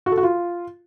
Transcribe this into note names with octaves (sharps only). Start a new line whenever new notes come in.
F#4
A4
F#4
F4